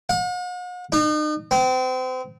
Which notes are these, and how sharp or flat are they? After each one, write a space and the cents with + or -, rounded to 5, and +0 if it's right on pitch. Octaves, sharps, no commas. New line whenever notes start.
F#5 -45
D#4 -40
C4 -35